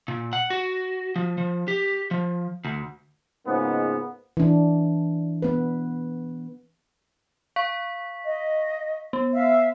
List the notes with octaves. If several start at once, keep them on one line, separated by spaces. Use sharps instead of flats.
A#2
F#5
F#4
F3
F3
G4
F3
D2
C#2 G#2 C#3 A#3 B3
E3 D4
B3 B4
F5 C#6 B6
D#5
B3
E5 F5